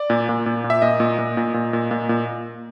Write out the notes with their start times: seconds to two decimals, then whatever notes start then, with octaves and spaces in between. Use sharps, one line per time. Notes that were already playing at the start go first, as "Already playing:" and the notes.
Already playing: D5
0.10 A#2
0.29 A#2
0.46 A#2
0.64 A#2
0.70 E5
0.82 A#2 D#5
1.00 A#2
1.19 A#2
1.37 A#2
1.54 A#2
1.73 A#2
1.91 A#2
2.09 A#2